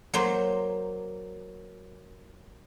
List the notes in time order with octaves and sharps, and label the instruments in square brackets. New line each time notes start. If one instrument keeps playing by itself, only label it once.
[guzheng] F#3 A#3 C5